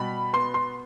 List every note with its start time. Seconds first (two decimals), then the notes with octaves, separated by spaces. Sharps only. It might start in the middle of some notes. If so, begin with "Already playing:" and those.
Already playing: B2 G3 B5
0.33 B3 C6
0.54 C6